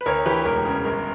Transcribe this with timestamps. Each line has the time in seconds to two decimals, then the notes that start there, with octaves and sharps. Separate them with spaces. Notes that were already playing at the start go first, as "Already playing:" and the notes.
0.01 B4
0.06 D2 A#4 C#5
0.26 E3 G4 B4
0.45 E1 A#4
0.65 C#3
0.84 G1 A#4